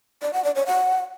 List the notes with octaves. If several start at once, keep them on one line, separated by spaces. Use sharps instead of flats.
D5
F#5
D5
C#5
F#5